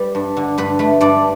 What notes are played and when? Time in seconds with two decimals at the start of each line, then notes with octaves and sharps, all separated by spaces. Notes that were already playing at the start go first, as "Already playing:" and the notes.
Already playing: G3 B4
0.15 G2
0.37 D3
0.58 G2 B4
0.79 A3 B4
1.01 G2 D5